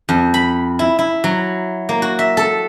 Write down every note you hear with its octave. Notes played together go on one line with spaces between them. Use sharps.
F2
B5
E4
E4
F#3
A#3
F#4
E5
A4